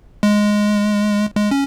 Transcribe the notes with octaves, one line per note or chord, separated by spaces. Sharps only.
G#3
G#3
C#4